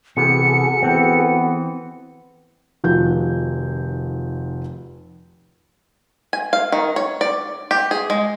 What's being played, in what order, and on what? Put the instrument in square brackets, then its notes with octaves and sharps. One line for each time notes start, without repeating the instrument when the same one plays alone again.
[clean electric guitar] C3 E3 B3 [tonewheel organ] F#4 G#4 A4 [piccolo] C#7
[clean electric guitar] E3 C4 [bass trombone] B3
[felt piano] F1 D#3 F3 F#4 G6
[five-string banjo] G#5
F5
D#3
C#5
D5
G4
G#4
G#3